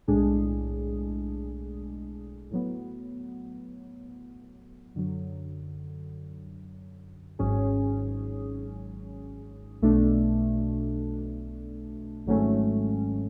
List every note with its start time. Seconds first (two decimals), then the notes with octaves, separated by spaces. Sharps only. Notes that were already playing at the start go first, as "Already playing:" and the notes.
0.08 B1 A2 G#3 D4 G#4
2.51 A2 F#3 B3
4.95 F#2 D3 F#3
7.39 G#1 G#2 F#3 C#4 G#4
9.82 B1 B2 A3 D4
12.26 G#1 G#2 F#3 A3 C#4